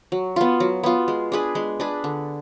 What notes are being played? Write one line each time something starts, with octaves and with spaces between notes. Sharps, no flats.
F#3
B3 F4
F#3
B3 F4
G#3
D4 G#4 B4
G#3
D4 G#4 B4
D3